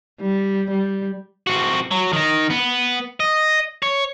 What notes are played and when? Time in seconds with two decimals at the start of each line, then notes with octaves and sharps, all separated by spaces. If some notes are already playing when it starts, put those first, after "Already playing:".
0.20 G3
0.70 G3
1.47 C4 F#4
1.91 F#3
2.13 D#3 D#4
2.50 B3
3.20 D#5
3.83 C#5